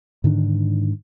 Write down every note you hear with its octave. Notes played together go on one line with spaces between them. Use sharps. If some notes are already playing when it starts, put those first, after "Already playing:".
G#2 D3 D#3 D4